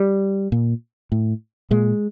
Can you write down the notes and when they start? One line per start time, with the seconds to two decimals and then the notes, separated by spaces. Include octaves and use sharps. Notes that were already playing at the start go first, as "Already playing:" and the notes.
Already playing: G3
0.52 A#2
1.12 A2
1.71 A#2 G#3